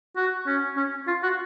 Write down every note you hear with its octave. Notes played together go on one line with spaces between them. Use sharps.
F#4
C#4
C#4
F4
F#4